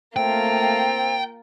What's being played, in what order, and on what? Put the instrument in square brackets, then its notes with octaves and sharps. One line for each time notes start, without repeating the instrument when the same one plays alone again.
[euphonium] A3 [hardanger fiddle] A#3 F4 [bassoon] C4 [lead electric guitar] G5